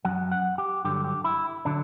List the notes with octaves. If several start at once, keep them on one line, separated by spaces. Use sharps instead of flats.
F#2 F#3 F#5
F#5
G4
G2 D3 F#3 G4
G4
E4
D3 F#3 D4